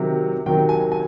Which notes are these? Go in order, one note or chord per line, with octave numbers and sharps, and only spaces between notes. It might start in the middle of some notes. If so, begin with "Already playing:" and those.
Already playing: C3 D#3 F#3
C3 D#3 F#3 G5
G#5
G#5